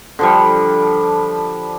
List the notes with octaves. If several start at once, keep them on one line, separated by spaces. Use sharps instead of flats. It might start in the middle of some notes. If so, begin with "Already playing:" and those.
D3 F3 G3